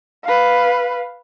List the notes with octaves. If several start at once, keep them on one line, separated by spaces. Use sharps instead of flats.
B4 F5